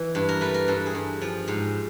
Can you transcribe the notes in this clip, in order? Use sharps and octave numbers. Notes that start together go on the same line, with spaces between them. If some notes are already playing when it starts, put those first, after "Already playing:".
Already playing: E3
G2
A#4
A3 B4
A#4
G2 A4
G#4
G2
F3
G#2